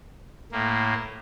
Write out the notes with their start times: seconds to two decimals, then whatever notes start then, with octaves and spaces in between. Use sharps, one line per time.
0.52 A2 A#3